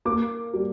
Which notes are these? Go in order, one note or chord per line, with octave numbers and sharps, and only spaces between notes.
A#3 D6
G3